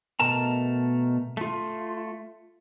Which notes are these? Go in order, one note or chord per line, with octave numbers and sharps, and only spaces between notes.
B2 A3 A#4 A5 A#5
A3 F4